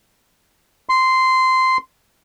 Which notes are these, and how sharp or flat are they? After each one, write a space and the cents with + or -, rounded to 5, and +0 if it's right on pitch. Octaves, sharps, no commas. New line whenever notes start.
C6 -10